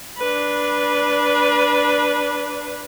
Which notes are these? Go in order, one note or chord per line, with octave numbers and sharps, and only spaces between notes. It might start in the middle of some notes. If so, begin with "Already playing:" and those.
D4 B4